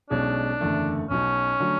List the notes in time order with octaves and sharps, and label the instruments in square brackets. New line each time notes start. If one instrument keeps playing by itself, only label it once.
[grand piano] B1 B2 G#3 C#4 [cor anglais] D4
[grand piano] F#1 E2 D3 A3
[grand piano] B1 B2 F#3 [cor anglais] C#4
[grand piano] D3 F#3 A3